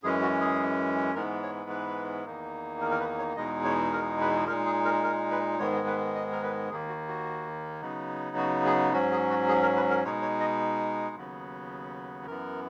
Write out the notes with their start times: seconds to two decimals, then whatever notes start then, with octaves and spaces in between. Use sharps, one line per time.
0.03 F#2 E3 G#3 C#4 G#4
0.22 F#4
0.41 G#4
1.15 G#2 E3 G#3 B3 A#4
1.43 C#5
1.70 B4
2.26 E2 D#3 A#3 D#4
2.81 A#4
2.91 A#4
3.00 B4
3.18 C#5
3.36 E2 B2 G#3 D#4 D#5
3.64 C#5
3.93 A#4
4.21 B4
4.47 A#2 G#3 D#4 A#4
4.66 G#4
4.85 A#4
5.04 A#4
5.31 B4
5.59 G#2 D#3 G#3 B3 C#5
5.87 B4
6.15 D#5
6.32 A#4
6.43 B4
6.70 D#2 D#3 A#3 G#4
6.88 F#4
7.08 F#4
7.82 C#3 F#3 B3 D#4
8.37 F#4
8.65 G#4
8.92 G#2 F#3 C#4 F#4
9.12 G#4
9.30 F#4
9.48 G#4
9.62 A#4
9.76 B4
9.90 A#4
10.04 B2 G#3 D#4 C#5
10.22 C#5
10.40 D#5
11.15 D#2 C#3 F#3 B3
12.26 F#2 E3 B3 A#4